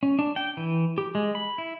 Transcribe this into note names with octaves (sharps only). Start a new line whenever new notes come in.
C#4
D4
G5
E3
G4
G#3
B5
E4